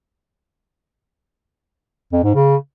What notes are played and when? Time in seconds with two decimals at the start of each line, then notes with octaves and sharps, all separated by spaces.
2.12 F2
2.23 G#2
2.34 C#3